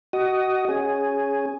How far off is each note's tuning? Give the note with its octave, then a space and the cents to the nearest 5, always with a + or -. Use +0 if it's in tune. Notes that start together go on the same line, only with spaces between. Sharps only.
F#4 +25 D#5 +0
C#4 +0 G#4 +0